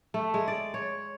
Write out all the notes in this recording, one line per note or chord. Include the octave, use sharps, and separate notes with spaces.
A3
G#3
D5
C#5